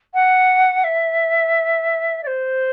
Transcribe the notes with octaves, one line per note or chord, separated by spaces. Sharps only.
F#5
E5
D5
C5